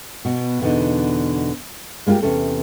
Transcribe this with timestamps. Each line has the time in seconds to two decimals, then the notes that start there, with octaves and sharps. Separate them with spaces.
0.25 B2
0.61 E2 B2 D3 D#4
2.07 G#3 A#3 E4 F4 G4
2.22 E2 C3 C#4 A4